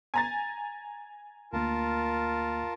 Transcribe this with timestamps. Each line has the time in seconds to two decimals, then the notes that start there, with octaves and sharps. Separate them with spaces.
0.14 G#5 A#5 A6
1.53 D2 A#3 F4 A#4 A5